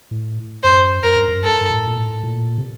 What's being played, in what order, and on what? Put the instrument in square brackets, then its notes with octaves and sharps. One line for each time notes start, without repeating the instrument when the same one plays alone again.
[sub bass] A2
[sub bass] F#2 [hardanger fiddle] C5
[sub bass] F#2 [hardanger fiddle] A#4
[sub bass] G2
F#2
[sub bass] G2 [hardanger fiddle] A4
[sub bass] G2
A2
A#2
A2
A#2
C3